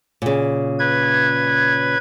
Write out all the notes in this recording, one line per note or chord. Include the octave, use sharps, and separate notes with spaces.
A#2 C#3
B4 G#6